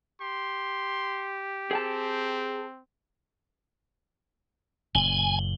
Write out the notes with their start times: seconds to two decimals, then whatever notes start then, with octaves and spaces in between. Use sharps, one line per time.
0.21 G4 C6
1.71 C4 G#4 G5 A5
4.95 F#1 A#2 G#5 F#7 G7